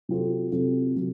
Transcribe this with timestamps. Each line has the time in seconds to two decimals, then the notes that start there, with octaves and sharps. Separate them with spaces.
0.09 C3 F#3 C4 F4 A4
0.52 C3 F#3 C4 F4 A4
0.95 C3 F#3